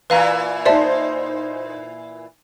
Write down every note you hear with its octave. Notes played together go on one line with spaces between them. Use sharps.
A#2 E3 B4 F5 A#5
D#4 C5 D5 E5 A5